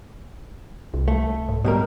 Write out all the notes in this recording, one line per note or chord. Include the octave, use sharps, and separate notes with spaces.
C2
A3
G#2
B2 G3 A#4